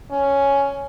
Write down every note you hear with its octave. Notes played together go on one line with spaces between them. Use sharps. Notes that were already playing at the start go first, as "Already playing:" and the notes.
C#4